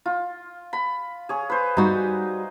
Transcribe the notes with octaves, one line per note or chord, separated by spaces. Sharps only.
F4
B5
G#4 C#5
B4 C5
G3 D#4 F#4